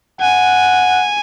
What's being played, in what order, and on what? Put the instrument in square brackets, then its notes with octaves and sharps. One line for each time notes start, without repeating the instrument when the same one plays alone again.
[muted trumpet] F#5 [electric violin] G#5